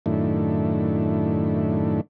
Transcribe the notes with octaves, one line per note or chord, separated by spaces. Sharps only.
F#2 A2 D#3 A3 D4 E4